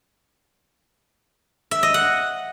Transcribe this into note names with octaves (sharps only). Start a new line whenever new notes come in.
E5
D#5
F#5